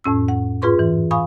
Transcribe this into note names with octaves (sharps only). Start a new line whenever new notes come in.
F2 A2 C#4 E6
F#5
G#2 F4 G#4 B4 C6 C#6
E3
F5 G#5 B5 C#6 D#6